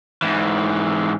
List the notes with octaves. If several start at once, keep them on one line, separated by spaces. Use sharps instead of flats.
G#2 E3